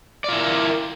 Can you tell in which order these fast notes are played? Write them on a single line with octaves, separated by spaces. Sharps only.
D5 F4 E4 A#4